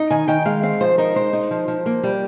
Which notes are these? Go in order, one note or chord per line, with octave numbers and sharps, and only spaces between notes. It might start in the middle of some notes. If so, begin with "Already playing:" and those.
Already playing: D#4
D#3 G#5
D#3 G5
G#3 F5
C4 F5
F3 C5
D#4 A#4
G#3 C5
D#4
F3
F3
A#3
G3